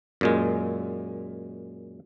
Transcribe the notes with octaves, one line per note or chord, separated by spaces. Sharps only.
F#2 A#2 G#3